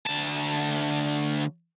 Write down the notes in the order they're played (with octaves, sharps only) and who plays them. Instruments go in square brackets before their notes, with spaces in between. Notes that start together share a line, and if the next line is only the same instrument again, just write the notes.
[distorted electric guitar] D2 A5